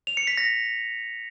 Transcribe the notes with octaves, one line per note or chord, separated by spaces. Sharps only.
F7
C#7
B6
A#6